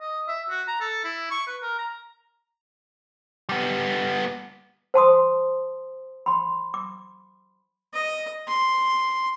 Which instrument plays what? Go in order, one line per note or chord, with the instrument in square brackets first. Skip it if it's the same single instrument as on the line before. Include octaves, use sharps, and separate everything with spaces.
[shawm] D#5
E5
F#4
A#5
A4
E4
C#6
B4
A#4
A#5
[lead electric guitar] G3 B3
[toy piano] C5 A5 C6 D#6
B5 C6
D6
[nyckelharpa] D#5
C6